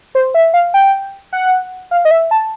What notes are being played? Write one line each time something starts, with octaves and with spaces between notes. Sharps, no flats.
C5
E5
F5
G5
F#5
F5
D#5
E5
A5